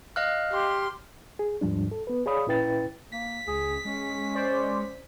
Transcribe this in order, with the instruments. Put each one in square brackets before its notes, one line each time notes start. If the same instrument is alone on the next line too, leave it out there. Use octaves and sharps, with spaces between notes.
[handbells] D#5 F5 F#6 [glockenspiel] F6
[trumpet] G4 [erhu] C6
[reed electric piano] G#4
D#2 G#2 F3 G3 D4
A4
B3 B4
G#4 C#5 D5 F5 B5 D#6
A#2 C#4 E4 B4 G5 A6
[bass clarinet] A#3 [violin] B6
[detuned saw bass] C#2 [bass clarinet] G#4
[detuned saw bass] G#3 [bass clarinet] C#4
[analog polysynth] C5 D5